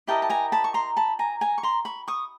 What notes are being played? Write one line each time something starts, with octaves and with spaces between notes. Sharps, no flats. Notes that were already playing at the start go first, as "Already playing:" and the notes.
E4 G4 A#4 D#5 G5 A5
A5
G#5 A#5
A5 B5
C#6
A#5 C6
A5 B5
G#5 A#5
G#5 A#5
C#6
A#5 C6
B5 C#6
C#6 D#6